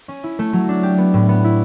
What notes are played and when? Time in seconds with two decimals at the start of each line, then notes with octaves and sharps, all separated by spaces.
0.08 C#4
0.24 E4
0.39 A3
0.53 F#3
0.69 D4
0.83 G4
0.98 B3
1.14 A2
1.29 B3
1.44 E4